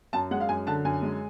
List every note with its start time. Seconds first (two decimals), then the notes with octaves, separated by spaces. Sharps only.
0.13 F#2 A5
0.31 G#3 F#5
0.40 F5
0.49 F#2 G#5
0.67 D3 A5
0.85 F#2 G#5
1.02 G#3